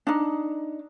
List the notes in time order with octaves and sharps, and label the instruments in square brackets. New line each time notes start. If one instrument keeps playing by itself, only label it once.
[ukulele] D4 D#4